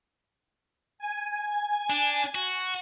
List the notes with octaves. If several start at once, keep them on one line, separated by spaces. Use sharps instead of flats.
G#5
D4
F#4